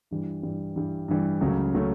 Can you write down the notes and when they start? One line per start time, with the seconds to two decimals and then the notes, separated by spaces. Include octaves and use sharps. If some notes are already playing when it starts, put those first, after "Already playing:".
0.11 G2 E3 G3
0.43 G2 E3 G3
0.76 G2 E3 G3
1.08 G2 E3 G3
1.41 C#2 C#3 F#3 A3 C#4
1.74 C#3 F#3 A3 C#4